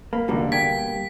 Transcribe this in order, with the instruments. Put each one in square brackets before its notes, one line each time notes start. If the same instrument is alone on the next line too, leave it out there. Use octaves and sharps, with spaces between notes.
[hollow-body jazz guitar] A#3 [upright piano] B5
[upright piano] E1 D3 [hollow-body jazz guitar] B2 G3 A#3
[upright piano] G5 G#6 D7 [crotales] B6